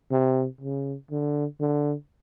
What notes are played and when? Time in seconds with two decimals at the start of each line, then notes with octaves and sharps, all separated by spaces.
0.12 C3
0.61 C#3
1.11 D3
1.60 D3